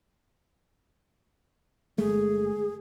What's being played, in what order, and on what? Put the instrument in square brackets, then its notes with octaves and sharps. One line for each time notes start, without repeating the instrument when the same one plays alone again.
[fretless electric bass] G1 G#3 A3 [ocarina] G#4